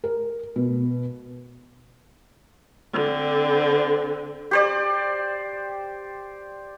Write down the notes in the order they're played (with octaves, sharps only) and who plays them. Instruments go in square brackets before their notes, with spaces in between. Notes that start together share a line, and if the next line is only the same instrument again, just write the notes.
[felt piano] A#4
B2
[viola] D3 C4
[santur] G4 C5 D5